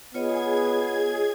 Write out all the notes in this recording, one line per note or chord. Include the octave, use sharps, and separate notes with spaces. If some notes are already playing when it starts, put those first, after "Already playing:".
B3 F4 G#4 C#5 D#5 G#6